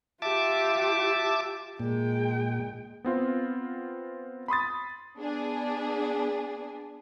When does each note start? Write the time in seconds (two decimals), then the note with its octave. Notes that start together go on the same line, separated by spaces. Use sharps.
0.22 F4 G4 E5 A5 D6
1.80 A#2 G#3 G5
3.04 B3 C4 F4
4.48 B5 C6 D#6 A6
5.17 B3 D4 G#4